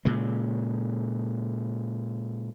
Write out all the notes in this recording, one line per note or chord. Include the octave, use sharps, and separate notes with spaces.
A#2 C#3 G#3